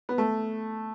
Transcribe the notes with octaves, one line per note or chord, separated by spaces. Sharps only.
B3
A3